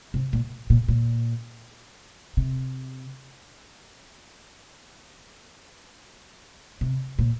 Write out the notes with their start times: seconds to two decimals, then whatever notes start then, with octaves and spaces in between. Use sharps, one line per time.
0.14 C3
0.33 A#2
0.70 A#2
0.88 A#2
2.37 C3
6.81 C3
7.19 A#2